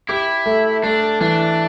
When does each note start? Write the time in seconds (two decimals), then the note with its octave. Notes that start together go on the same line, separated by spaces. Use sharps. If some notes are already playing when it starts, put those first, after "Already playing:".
0.09 E4 G4
0.46 A3
0.83 A3 D4
1.21 E3 D4